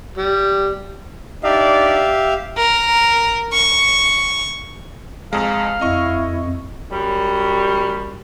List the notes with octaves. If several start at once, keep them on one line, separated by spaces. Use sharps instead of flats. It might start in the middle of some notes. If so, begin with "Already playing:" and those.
G3
D4 D#4 G4 D5 E5 F5
A#4
C#6
F2 G#3 F5 A#5
F2 E4 D#5 C#6
F#2 G3